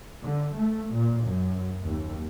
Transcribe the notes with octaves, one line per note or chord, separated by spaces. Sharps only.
D3
A3
A#2
F#2
D#2